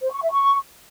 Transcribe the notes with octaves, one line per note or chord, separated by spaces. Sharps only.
C5
C#6
E5
C#6